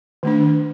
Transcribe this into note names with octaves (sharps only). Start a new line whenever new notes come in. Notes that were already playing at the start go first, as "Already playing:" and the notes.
D#3 A3 D4